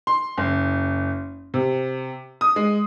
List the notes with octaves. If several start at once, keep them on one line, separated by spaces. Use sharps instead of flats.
C6
F#1
C3
D#6
G#3